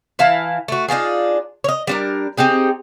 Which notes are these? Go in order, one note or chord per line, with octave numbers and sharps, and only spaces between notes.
E3 E4 F5 A5
A3 F#4
D4 D#4 F4 G#4
C#5 D#5
G3 D4 A#4
C4 D#4 G4 G#4